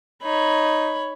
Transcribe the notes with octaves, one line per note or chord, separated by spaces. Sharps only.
D#4 C#5 B5